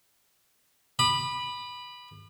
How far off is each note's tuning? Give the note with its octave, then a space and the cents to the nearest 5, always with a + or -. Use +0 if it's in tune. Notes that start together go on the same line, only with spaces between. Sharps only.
B5 -5 D6 +45